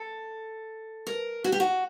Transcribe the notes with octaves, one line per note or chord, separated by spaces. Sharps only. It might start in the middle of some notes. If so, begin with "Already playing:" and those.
Already playing: A4
A#4
F#4
G4
F#4